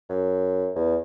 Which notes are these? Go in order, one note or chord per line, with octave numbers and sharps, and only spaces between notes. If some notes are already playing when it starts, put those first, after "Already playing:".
F#2
E2